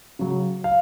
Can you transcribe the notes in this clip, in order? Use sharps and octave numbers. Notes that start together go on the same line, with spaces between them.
C#3 F#3
F5